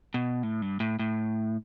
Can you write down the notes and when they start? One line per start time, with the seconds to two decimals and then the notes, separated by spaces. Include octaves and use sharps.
0.14 B2
0.43 A2
0.62 G2
0.80 A2
0.99 A2